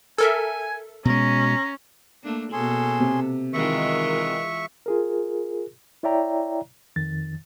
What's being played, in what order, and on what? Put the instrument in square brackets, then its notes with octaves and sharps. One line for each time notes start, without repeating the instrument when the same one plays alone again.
[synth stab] A4 A#4 E5 [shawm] G#5
[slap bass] B2 G#3 [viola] C#4 [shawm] A#5
[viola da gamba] A3 A#3 D4
[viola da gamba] B2 A#3 A4 [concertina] C#4 G#4 C6
[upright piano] C3
[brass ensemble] D#3 [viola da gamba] E3 G#3 F4 [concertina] E5 C#6
[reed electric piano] F4 G#4 A#4
E4 C#5 D5 E5 G5 A#5
F2 D#3 A6